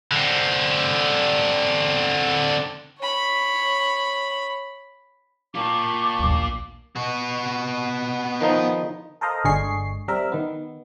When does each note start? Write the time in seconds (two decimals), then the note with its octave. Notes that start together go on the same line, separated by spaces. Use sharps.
0.11 D3 C4
2.98 C#5 B5
5.55 A#3 F4 G5 A5 C#6 D6
6.19 A#1 D#2
6.96 B3 F#4
8.41 D#3 F3 D#4
9.21 A4 A#4 C5 D#5 F5 A#5
9.44 G1 D3 G#3 G#4 C#6 C7
10.08 G3 C4 A#4 E5
10.32 D#3 B3